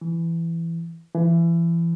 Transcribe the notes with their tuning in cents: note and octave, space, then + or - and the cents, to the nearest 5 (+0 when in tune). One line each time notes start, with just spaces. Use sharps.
E3 +15
E3 +30